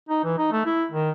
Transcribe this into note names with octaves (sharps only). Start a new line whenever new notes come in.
D#4
E3
D#4
A3
E4
D#3